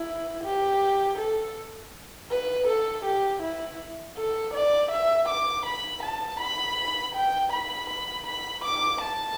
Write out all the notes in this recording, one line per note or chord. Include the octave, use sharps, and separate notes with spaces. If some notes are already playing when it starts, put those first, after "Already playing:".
Already playing: E4
G4
A4
B4
A4
G4
E4
A4
D5
E5
D6
B5
A5
B5
G5
B5
B5
B5
D6
A5